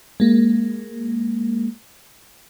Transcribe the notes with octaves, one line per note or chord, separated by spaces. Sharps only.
G#3 A#3